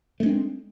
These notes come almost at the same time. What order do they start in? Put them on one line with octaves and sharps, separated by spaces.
A3 G#3 D4 C4